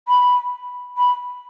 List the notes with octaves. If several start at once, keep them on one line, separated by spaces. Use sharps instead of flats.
B5
B5